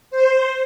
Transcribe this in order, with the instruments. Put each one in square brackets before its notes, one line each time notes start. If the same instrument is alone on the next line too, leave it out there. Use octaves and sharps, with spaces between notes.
[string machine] C5